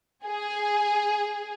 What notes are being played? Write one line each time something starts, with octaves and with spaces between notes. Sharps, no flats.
G#4